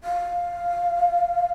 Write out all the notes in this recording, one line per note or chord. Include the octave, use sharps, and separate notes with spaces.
F5